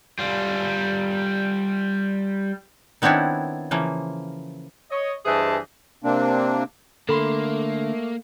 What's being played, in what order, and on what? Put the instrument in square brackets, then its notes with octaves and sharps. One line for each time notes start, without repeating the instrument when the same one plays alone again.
[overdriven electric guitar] G3 F4
[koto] D#3 B3 C4 D4 E4 C#5
C#3 E3 F3 A#3
[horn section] C#5 D#5
G2 E3 G#4 C5 D#5 A5
[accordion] C3 A#3 C4 D4
[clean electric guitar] D3 B5 C6 [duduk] A3 [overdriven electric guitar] A#3 [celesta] A4